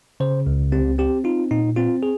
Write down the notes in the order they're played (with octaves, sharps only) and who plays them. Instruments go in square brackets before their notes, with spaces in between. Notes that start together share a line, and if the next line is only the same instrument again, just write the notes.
[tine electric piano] C#3 C5
C#2
C4 G4
C4 G4
D#4 F4
A#2 D#4
C4 F4
G#4